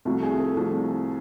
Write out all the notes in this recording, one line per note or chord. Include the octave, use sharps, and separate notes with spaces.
C2 C3 F3 A3 F#4
G#4
A4
C2 C3 F3 A3